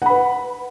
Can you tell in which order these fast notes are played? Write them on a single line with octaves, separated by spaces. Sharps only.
F#5 B5 B4